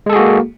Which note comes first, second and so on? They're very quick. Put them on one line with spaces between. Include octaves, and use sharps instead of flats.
G#3 A4 G#4 F#4 A#3